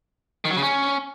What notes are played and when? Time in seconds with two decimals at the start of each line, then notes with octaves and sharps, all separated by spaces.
0.45 D#3
0.51 F#3
0.57 C#3
0.63 C#4